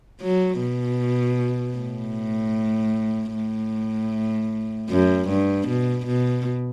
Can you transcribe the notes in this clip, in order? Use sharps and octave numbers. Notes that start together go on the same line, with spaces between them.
F#3
B2
A2
A2
F#2
G2
B2
B2